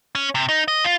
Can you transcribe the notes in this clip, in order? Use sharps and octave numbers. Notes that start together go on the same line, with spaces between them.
C#4
C3
D#4
D#5
F4